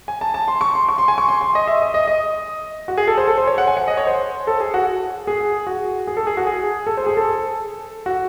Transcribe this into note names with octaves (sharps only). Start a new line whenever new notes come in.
G#5
A5
A5
C6
C#6
C6
C#6
C6
G#5
C#6
C6
C6
D#5
E5
D#5
D#5
D#5
F#4
G#4
A4
C5
A4
C5
C#5
F#5
G#5
F#5
D#5
C#5
C5
A4
G#4
F#4
G#4
F#4
G#4
A4
G#4
F#4
G#4
A4
C5
G#4
A4
F#4